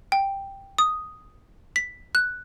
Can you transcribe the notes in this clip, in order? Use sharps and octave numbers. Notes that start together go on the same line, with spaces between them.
G5
D#6
B6
F#6